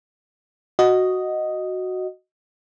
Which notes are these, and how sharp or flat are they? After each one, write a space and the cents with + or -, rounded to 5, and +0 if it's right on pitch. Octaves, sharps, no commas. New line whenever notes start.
F#4 +0 D#5 +0